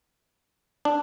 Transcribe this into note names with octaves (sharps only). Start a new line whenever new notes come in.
D4